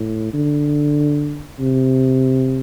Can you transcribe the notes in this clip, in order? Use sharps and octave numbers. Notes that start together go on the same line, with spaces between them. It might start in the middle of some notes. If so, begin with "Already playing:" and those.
Already playing: A2
D3
C3